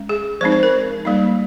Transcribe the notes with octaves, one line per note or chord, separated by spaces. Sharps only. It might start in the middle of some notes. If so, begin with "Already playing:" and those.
Already playing: G#3 C#4
G#4
F3 G#3 C4 D#4 C5
C5
A#4
G3 A#3 D#4